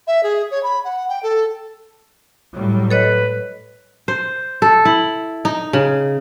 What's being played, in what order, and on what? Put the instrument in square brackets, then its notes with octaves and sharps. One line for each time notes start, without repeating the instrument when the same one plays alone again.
[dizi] E5
G#4
C#5
B5
F#5
G5
A4
[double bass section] A2 F#3 G3
[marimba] A4 C#5 D#5 [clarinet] B4
[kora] C5
A4
E4
D#4
C#3